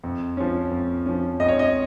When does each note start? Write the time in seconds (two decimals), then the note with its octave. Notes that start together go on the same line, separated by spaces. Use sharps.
0.03 F2
0.37 F3 C#4
0.71 F2
1.06 F3 C#4
1.40 F2 D#5
1.48 C#5
1.59 D#5